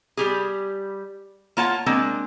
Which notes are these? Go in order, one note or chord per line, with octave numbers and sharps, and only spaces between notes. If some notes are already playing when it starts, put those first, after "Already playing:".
G3 G4 G#4
A#3 F4 C#5 F#5 A5
G#3 A#3 C4 D4